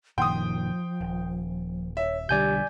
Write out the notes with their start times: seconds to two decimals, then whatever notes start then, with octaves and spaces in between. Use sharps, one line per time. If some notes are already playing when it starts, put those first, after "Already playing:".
0.18 F#1 A#2 D#3 F3 G5 C6 D#6
1.01 D#1
1.97 C#5 E5
2.29 B1 D3 G3 G4 D5 G#5 G6